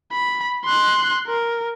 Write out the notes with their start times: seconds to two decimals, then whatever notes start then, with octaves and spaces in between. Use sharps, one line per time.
0.12 B5
0.65 C6 F#6
1.27 A#4